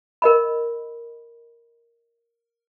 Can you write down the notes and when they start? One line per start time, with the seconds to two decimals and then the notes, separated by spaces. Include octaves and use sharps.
0.22 A#4 D#5 B5